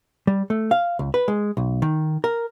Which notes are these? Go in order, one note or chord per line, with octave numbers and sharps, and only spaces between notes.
G3
A3
F5
C#2
B4
G#3
B1
D#3
A#4